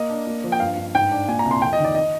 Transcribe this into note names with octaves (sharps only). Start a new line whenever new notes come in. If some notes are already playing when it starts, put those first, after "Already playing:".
Already playing: A#3 D#5
D4
A#3
F3
G5
G2 F5
G2
G#2 G5
D4
A#2 G#5
A#5
C2
C6
F2 G5
D#5
D#3
D5
D#5